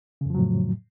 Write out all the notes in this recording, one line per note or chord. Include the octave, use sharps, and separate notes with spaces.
F2 A2 C#3 F3 F#3